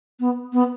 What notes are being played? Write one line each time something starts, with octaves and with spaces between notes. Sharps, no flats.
B3
B3